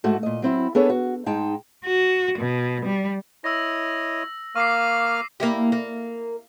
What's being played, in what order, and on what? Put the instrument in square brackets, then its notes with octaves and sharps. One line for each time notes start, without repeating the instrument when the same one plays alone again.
[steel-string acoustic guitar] G#2 A3 F#4 A5
A#2 D#5
F#3 C4 E4
B3 D4 G#4 A4 B4 C#5
F#4
G#2 G#3 D#4 G5 A5
[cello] F#4
B2
G3
[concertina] E4 C#5 D#5 [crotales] E6 A#6
[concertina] A#3 F5 F6 [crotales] C#6 D6 C7
[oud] A#3 E4 G4
A#3